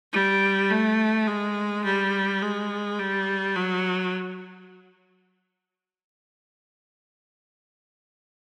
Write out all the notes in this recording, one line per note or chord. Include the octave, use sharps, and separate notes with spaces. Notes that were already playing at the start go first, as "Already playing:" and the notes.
G3
A3
G#3
G3
G#3
G3
F#3